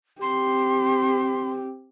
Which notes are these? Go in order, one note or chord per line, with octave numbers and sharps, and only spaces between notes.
C4 G4 C6